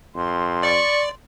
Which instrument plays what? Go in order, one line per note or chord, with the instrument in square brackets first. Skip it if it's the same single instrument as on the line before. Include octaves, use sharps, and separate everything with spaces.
[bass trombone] F2 [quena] C6
[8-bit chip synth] D5 [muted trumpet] C#6